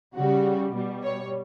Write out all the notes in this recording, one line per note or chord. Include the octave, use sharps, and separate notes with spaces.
C#3 G3 F#4
B2 G3
C#5